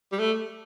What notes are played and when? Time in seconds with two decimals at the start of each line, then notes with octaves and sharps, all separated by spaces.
0.12 G3
0.19 A3